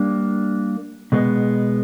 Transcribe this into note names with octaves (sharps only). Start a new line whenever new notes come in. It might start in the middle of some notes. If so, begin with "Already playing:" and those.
Already playing: G3 A#3 D4
B2 G#3 B3